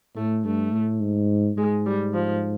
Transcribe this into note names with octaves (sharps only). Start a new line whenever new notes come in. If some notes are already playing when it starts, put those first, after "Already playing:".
A2 A3
G2 A3
A2
G#2
G#2 G#3
G3
F3